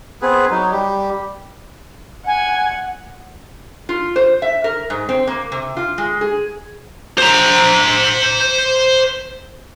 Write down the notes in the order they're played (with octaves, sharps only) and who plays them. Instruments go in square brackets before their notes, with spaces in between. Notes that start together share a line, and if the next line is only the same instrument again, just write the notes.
[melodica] B3 C4 G#4 B4
F#3 D#4
G3 G4
[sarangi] F#5 [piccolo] G#5
[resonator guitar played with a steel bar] F4
C5
E5
A#4
G#2
C4
A#3
C3
F4
G#3
G#4
[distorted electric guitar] C5 A#5